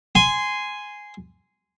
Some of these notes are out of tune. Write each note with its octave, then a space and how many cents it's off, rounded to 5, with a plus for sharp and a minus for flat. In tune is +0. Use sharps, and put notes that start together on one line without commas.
G#5 +0 C6 -15